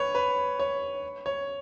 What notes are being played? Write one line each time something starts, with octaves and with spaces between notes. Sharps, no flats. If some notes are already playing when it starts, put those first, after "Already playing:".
Already playing: B4 C#5
B4
C#5
C#5